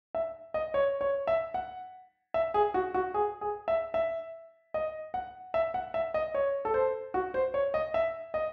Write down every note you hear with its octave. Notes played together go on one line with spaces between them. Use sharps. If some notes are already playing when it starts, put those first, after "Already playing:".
E5
D#5
C#5
C#5
E5
F#5
E5
G#4
F#4
F#4
G#4
G#4
E5
E5
D#5
F#5
E5
F#5
E5
D#5
C#5
A4
C5
F#4
C5
C#5
D#5
E5
D#5